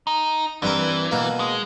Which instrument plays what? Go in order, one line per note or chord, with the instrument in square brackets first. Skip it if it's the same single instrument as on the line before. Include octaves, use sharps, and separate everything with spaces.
[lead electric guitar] D#4
[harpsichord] G2 C4 A#4 [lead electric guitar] E3
[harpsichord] B2 A#3
[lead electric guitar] G#3